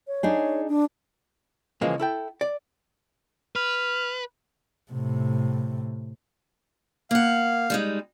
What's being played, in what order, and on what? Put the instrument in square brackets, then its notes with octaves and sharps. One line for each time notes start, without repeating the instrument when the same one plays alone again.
[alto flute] C#5
[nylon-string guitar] D4 D#4 G#4
[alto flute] D4
[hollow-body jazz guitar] C#3 E3 F3 G#3 A#3
E4 A4 G5
D5
[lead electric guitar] B4 [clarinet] F6
[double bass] A2 C3
[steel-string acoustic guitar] A#3 F#5 [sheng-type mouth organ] F5
[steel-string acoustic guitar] G3 G#3 D#4